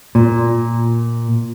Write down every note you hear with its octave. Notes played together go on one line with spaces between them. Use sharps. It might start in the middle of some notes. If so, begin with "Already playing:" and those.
A#2